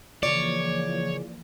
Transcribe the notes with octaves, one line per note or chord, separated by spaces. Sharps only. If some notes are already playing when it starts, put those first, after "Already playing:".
C#3 E3 F3 A#3 C#5 D5